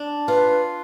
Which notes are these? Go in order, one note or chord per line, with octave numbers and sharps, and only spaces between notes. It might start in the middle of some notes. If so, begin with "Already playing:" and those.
Already playing: D4
F4 B4